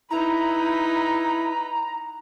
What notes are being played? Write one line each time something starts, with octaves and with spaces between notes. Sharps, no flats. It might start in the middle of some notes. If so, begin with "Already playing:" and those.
D#4 E4 B4 A#5